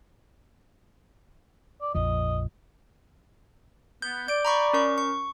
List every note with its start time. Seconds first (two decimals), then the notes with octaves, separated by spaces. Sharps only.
1.82 D5
1.95 A#1 F2 F3 D#5
4.02 B3 G6
4.28 D5 G6 D7
4.45 A#5 B5 C#6
4.73 C#4 A#4 C#6
4.98 C#6